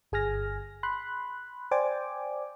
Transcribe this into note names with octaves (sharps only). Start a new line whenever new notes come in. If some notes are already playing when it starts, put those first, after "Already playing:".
G1 G#4 G#5 F6 A#6
B5 C6 F#6
C5 D5 G5 G#5 D6